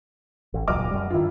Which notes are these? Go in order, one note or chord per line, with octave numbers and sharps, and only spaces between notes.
A1
D#1 C#2 F#3 D#5 D6 F6
F#2 G3
G2 D#3 E4 F4